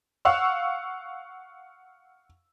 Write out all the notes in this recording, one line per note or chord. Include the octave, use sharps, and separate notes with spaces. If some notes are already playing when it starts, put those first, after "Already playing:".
F5 F#5 C#6 E6